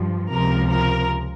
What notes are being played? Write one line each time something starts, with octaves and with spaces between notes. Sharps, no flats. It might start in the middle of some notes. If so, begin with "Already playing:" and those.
Already playing: G2 F3
C#2 C3 F3 A#4
A#4